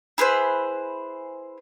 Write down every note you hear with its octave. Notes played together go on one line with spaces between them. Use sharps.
E4 G#4 B4 C5